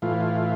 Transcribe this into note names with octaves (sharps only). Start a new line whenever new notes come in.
A2 E3 F4